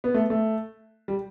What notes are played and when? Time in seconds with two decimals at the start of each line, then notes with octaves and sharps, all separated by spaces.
0.04 B3
0.14 A3
0.30 A3
1.08 G3